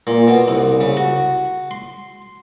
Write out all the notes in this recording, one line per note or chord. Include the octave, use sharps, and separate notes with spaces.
A#2
B2
C2
C#3
F#4
C6